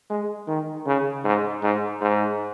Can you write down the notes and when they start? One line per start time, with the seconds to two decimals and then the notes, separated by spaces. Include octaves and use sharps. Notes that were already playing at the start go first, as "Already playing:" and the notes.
0.10 G#3
0.48 D#3
0.86 C#3
1.24 G#2
1.63 G#2
2.01 G#2